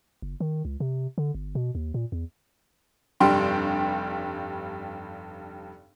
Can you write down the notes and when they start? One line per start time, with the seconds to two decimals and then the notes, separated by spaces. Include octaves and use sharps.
0.22 F#1
0.40 D#3
0.65 C#2
0.80 C3
1.18 D3
1.35 G1
1.55 B2
1.75 D#2
1.94 A#2
2.12 E2
3.20 F1 G2 G3 G5 C6